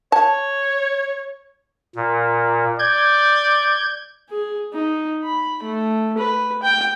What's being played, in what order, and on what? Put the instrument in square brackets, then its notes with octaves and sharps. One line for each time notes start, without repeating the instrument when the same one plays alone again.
[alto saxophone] C#5 [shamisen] A5
[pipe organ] A#2
[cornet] D5 [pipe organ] G6 G#6
[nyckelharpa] G#4
D#4
B5
A3
B4
G5